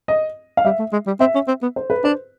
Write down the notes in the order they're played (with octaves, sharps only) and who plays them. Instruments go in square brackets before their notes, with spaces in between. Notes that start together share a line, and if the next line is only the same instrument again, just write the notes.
[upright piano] D#5
F5
[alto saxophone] G3 [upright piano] E5
[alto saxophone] A3
G#3
G3
[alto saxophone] C4 [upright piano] E5
[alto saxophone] C#4
C4
B3
[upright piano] C5
B4
[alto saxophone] D4 [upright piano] C5